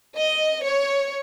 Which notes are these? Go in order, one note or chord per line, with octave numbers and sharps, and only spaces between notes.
D#5
C#5